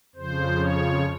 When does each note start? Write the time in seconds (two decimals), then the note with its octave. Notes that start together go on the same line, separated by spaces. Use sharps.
0.15 F2 C#3 F3 C5
0.60 C#5